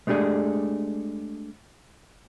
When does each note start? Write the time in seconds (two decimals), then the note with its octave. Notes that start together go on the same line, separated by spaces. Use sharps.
0.07 G#3 A3 D4 G4 G#4